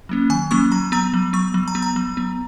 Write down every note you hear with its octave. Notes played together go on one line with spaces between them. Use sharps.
F#3 A#3 C#4
D#3 G#5
F#3 A#3 C#4 C#6
F#3 A#5
B3 A#5
F#3
B3 C#6
F#3
A#5
B3
A#5
F#3
B3